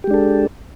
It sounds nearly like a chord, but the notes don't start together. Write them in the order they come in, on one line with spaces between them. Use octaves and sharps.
G4 G#3 D4 A4